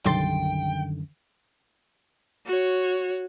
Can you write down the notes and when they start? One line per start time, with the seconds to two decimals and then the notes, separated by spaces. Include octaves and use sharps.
0.06 B1 F#2 D3 D#3 G3 G5 C6 A6
2.46 F#4 C#5